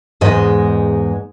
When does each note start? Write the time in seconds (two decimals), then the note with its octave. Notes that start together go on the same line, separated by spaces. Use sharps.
0.21 E2 G#2 G#3 D#5